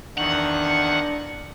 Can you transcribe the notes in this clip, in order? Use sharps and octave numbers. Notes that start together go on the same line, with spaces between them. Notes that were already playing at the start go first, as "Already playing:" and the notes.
E2 D#3 D4 F#5 C#6